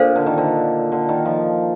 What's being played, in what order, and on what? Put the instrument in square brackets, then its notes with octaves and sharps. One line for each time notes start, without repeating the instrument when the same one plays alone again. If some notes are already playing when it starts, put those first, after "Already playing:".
Already playing: [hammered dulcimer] A#2 [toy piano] D4 A4 C5 F5
[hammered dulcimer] D3
D#3
D3
D3
D#3
F3